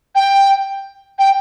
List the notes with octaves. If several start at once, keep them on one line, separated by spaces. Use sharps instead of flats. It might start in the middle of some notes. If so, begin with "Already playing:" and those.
G5
G5